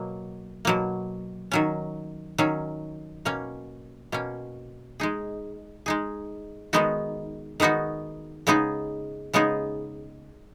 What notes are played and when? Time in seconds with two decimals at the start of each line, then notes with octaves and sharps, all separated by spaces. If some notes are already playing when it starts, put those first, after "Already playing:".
Already playing: B2 F#3 A#3
0.65 B2 F#3 A#3
1.51 D#3 F#3 C#4
2.38 D#3 F#3 C#4
3.25 B2 A#3 C#4
4.12 B2 A#3 C#4
5.00 G#3 D#4 G#4
5.86 G#3 D#4 G#4
6.73 D#3 G#3 B3 D#4 F#4
7.60 D#3 G#3 B3 D#4 F#4
8.47 C#3 G#3 B3 D#4 G#4
9.33 C#3 G#3 B3 D#4 G#4